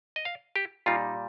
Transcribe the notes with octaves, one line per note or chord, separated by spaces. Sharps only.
D#5
F5
G4
A#2 G3 D#4 F4